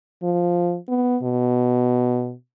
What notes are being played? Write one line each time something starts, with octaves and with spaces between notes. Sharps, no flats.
F3
B3
B2